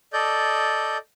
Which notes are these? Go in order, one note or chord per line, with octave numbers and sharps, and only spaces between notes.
A4 D5 D#5 G6